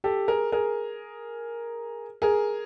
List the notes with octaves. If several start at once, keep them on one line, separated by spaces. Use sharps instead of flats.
G4 A4
G#4 A#4
G#4 A#4
G#4 A#4